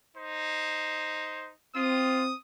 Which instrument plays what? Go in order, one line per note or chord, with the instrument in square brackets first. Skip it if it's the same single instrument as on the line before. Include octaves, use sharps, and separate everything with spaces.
[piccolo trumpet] D#4 [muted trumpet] C5
[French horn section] C4 [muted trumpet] F4 [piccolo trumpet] D#6